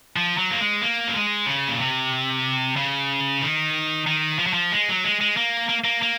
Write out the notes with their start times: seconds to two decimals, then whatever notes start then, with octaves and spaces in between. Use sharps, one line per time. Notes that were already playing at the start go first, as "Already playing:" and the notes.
0.16 F3
0.38 F#3
0.50 A#3
0.61 G#3
0.82 A#3
1.08 F#3
1.14 G#3
1.46 C#3
1.68 A#2
1.79 C3
2.76 C#3
3.42 D#3
4.07 D#3
4.39 F3
4.47 F#3
4.53 F3
4.72 G#3
4.89 F#3
5.04 G#3
5.21 G#3
5.37 A#3
5.69 A#3
5.84 A#3
6.02 A#3